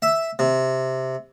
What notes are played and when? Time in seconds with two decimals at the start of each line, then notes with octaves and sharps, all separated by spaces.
0.02 E5
0.39 C3